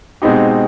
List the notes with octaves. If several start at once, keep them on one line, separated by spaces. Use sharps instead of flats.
B2 G#3 C4 D#4 G4